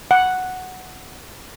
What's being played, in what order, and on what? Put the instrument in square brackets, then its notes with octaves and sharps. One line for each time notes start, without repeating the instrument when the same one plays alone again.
[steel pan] F#5